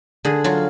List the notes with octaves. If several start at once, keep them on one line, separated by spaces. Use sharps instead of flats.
D3 G#4
F#3 F4